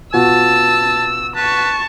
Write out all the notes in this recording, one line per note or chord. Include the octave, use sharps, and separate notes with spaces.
B2 F4 F#4 A5 E6
B4 A5 C#6